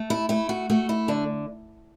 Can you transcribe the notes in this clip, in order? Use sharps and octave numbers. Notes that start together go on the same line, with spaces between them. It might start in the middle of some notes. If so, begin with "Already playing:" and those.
Already playing: A3
E4
A3 E4
F#4
A3 F#4
E4
D3 D4